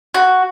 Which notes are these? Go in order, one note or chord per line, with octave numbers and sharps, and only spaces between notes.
F#4